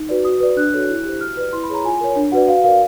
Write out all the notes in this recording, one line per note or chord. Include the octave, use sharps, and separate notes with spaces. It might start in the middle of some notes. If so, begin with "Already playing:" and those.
Already playing: D#4
F#4 B4 D5
F#4 D#6
B4 D5
D4 F#6
F#4 A4 C#5
E4
G4 C5
F#4 F6
B4 D5
E4 C6
B5
G#4 C#5 A#5
F4 G#5
A#4 C#5
D4
F#4 B4 D5 F#5
F#4 F5
A#4 D5 F5